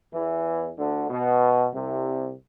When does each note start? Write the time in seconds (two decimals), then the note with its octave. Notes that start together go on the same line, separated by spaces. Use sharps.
0.13 E2 E3
0.78 D2 D3
1.10 B2
1.74 C2 C3